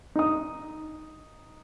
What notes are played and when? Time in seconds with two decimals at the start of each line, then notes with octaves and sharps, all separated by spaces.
0.16 D#4 D#6